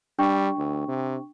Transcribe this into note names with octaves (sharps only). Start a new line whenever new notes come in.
G3 D4 G5 C#6
D2
C3